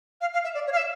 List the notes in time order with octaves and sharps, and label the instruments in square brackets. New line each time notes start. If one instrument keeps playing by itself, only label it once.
[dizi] F5
F5
E5
D5
C#5
F5
E5